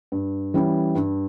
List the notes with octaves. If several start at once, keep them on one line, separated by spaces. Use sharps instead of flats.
G2
E3 G3 C#4
G2